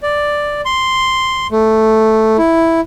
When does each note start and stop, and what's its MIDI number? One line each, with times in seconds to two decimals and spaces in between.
0.02 0.61 74
0.65 1.47 84
1.51 2.37 57
2.38 2.81 64